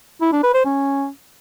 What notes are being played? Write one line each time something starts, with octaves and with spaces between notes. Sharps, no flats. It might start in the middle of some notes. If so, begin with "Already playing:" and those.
E4
D4
B4
C5
C#4